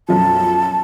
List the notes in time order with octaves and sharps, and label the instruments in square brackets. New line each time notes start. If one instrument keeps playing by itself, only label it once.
[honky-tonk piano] B1 F#2 F3 [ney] A5